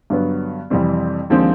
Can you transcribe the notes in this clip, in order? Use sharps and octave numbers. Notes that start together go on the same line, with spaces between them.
G2 D3 F#3 B3
F2 C3 E3 G3 C4
D#2 D3 F3 G#3 C4